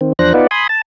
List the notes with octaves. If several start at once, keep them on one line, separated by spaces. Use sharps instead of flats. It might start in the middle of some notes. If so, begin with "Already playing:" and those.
D#3 C4
E2 F3 D4 C5 F#6 A#6
B3 D#4 F4 B4 D5 F#5
G#5 B5 C6 D#6
A5